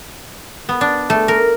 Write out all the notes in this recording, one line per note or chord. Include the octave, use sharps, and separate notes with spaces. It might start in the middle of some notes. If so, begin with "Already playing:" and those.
B3
D4
A3
A#4